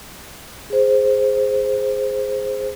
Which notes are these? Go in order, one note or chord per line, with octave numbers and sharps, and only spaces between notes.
G#4 C5